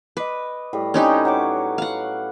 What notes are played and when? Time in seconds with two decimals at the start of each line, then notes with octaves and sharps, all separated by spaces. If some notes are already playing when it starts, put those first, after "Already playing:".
0.17 B4 D#5 D6
0.73 A2 G3
0.94 C4 C#4 D#4 G4 B4 D#5
1.25 F#3 C#5 D6
1.78 F5 F#5